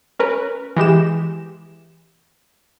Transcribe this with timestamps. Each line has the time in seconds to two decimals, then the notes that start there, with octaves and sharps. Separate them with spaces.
0.19 C#4 A#4 B4
0.77 E3 G#3 G4 E7